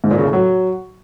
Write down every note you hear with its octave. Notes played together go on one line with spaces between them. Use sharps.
G#2
A#2
C#3
A2
F#3